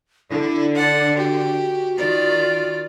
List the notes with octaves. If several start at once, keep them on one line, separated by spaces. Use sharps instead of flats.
D3 E4
D5 F#5 A5
F#4 G4
D#3 F4 D5